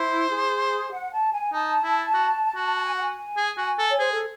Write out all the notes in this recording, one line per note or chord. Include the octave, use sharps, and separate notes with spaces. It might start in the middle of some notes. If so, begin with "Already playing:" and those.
Already playing: E4 C5
G#4
F#5
A5
G#5
D#4 A5
E4
F#4
F#4
A5
G#5
F#5
G#5
G#4
F#4
A4
C#5
G#4 C5
A4